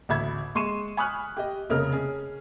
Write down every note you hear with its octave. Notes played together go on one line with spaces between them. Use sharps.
A1 D2 E5 B5 G#6
G#3 C6 C#6 D#7 E7
G#5 B5 C#6 D#6 F6 F#6
G4 D#5
F1 C#3 A#4 D#5 F6
C#4 G#4